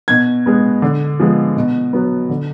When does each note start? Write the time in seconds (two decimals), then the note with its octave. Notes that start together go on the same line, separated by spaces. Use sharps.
0.08 B2 G#6
0.46 G#3 B3
0.82 D3
1.20 F3 G#3 B3
1.57 B2
1.93 F#3 B3
2.29 D3